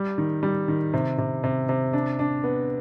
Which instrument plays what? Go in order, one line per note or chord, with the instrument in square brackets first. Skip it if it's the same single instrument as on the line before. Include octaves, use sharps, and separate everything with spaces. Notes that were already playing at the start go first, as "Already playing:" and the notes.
Already playing: [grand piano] G3
D#3
G3
D#3
C3
C3
C3
C3
D4
D4
B3